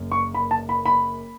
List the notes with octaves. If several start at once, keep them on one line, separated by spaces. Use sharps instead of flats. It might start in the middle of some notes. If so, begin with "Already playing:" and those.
Already playing: F#1 F#2
C#6
B5
A5
B5
B5